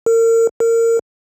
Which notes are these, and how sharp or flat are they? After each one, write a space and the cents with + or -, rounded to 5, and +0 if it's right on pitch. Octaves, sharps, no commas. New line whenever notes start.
A#4 -35
A#4 -25